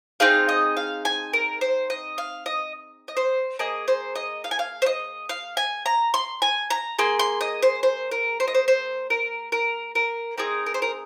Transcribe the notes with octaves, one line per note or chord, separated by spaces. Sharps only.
C4 D#4 G#4 F5
D#5
F5
G#5
A#4
C5
D#5
F5
D#5
D#5
C5
A#3 G#4 D#5
C5
D#5
F5
G#5
F5
C5
D#5
F5
G#5
A#5
C6
G#5
A#5
A#3 G#4 C6
C6
D#5
C5
C5
A#4
C5
D#5
C5
C5
A#4
A#4
A#4
C4 D#4 G#4 A#4
A#4
C5
A#4